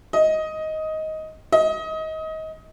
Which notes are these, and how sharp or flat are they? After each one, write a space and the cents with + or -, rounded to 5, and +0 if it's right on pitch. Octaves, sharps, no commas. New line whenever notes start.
D#5 +10
D#5 +25